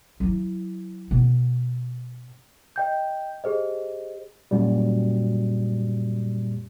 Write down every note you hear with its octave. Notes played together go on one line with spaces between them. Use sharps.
F#3 E4
B2 B3
D#5 G5 G6
G4 G#4 C5 D#5
F#2 A#2 G3